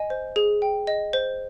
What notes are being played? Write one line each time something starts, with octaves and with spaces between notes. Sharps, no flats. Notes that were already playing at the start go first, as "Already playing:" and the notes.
Already playing: D#5 G#5
C5
G#4
G5
D#5
C5